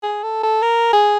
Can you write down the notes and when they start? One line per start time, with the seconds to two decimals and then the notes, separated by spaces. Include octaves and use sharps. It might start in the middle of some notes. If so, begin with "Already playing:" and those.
0.03 G#4
0.23 A4
0.43 A4
0.63 A#4
0.93 G#4